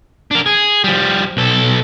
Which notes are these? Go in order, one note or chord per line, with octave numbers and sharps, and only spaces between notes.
D4 A#4
G#4
F3 G3
B1 A4